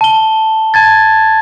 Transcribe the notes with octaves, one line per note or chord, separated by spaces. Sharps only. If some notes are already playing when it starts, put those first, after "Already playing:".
A5 G7
A5 G#6 A6